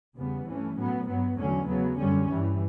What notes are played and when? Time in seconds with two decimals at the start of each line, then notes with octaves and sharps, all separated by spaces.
0.16 E2 C#3 G3 B3
0.47 G2 E3 A3 C#4
0.77 A2 F#3 B3
1.08 G2 F#3 B3
1.38 E2 D3 F#3 A3 C#4
1.69 C#3 F#3 B3
1.99 F#2 D3 G3 C#4
2.30 G2 E3 G3